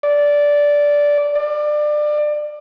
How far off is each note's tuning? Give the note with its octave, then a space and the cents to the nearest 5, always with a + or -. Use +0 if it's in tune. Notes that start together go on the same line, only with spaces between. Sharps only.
D5 -10
D5 +25